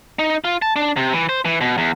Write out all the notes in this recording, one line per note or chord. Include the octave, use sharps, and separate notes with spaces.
D#4
F4
A5
D4
C3
E3
C5
E3
B2
E2